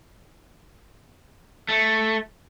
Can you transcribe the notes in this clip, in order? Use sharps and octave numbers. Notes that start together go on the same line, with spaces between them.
A3